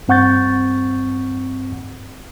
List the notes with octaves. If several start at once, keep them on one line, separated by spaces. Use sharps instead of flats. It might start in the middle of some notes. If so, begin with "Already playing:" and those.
G2 C4 F#5 C#6 G6 A6